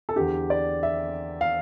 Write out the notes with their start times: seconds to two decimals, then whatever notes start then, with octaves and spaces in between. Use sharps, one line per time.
0.09 A4
0.16 E2 D3 G4
0.50 D5
0.83 E5
1.41 F5